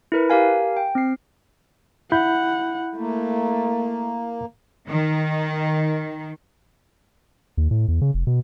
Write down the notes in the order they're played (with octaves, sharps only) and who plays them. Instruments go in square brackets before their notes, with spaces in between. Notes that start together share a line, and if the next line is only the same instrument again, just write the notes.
[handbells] E4 A#4 B4
G4 A#4 F5 G#5
G5
C4 C7
[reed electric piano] E4 B5 G6 [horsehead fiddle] F#5
[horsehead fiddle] A3 [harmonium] A#3
[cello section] D#3
[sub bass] D#2
A2
E2
C#3
F1
B2